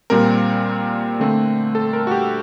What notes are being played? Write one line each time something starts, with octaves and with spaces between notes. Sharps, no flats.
A#2 G3 C4 A#4
D3 A3 C4
A4
A#4
F#4
G4